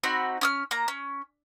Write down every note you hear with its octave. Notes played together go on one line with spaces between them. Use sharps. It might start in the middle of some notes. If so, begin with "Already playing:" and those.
C4 D#4 F#4 B5
C#4 D#6 F6
A#3 A#5
C#4